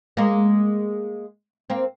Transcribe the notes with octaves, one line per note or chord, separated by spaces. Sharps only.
G#3 A#3
A#3 C4